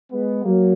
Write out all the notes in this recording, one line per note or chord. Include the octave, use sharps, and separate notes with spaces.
G#3 B3
F#3 A#3